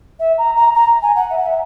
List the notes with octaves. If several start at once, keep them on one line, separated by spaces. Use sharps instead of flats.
E5
A#5
A#5
A#5
G#5
F#5
E5
F#5
E5